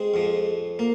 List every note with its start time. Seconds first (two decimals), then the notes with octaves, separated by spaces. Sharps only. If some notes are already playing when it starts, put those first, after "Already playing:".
Already playing: G#3 C4
0.14 F2 F3
0.79 A#3